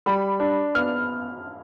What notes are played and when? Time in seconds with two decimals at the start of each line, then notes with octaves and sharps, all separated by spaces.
0.06 G3 B5
0.40 D4
0.75 B3 F6